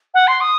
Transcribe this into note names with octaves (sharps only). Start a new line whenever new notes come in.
F#5
C6
D#6